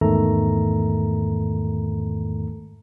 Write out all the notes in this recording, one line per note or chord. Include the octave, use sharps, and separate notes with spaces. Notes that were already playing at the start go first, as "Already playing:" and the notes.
E2 G#2 D#3 A3 A4 A#5